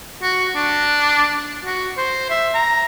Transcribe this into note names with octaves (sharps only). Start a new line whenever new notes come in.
F#4
D4
F#4
C5
E5
A#5